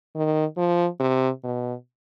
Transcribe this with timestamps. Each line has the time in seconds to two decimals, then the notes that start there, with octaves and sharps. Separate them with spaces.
0.15 D#3
0.57 F3
1.00 C3
1.44 B2